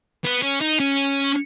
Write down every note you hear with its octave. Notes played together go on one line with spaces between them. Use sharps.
B3
C#4
D#4
C#4